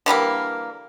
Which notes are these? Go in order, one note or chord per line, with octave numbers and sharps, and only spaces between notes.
D3 E3 G3 A#3